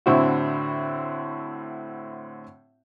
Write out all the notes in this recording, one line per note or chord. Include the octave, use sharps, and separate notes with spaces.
A2 D3 C4 E4 F#4